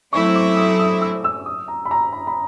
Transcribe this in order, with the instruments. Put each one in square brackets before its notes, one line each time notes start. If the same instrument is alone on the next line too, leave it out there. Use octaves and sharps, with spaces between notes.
[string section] F#3 A3 C4 E4 [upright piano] C#6
[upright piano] D6
D#6
D#6
E6
E6
D#6
A#5
B5
A#5
B5
B5